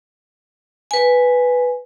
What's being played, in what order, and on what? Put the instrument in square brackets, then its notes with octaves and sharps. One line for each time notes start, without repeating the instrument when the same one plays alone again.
[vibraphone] B4 G#5